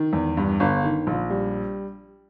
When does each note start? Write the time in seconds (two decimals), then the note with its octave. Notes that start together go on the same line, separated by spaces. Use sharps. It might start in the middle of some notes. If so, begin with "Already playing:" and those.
Already playing: D#3
0.13 E2
0.37 G2
0.60 G1
0.84 D#3
1.07 A#1
1.30 G3